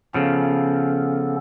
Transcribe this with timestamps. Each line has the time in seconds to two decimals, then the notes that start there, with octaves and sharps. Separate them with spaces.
0.14 C#3 F3 B3 C#4 A4